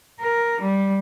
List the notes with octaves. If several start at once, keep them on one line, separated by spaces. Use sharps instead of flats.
A#4
G3